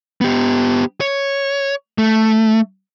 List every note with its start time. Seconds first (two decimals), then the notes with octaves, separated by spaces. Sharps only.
0.21 B3 G4
1.01 C#5
1.98 A3